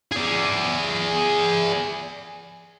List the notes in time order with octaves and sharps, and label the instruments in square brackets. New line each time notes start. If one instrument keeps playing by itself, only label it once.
[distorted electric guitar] G#4 D5